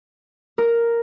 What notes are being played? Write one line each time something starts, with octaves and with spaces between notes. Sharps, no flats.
A#4